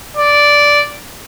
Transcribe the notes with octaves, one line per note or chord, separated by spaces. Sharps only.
D5